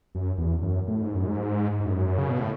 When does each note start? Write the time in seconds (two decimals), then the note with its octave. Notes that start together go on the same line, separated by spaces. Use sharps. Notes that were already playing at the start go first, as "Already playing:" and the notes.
0.15 F#2
0.38 E2
0.62 F#2
0.88 A2
1.01 G#2
1.14 F#2
1.28 G#2
1.80 G#2
1.85 F#2
2.18 C#3
2.29 B2
2.40 A2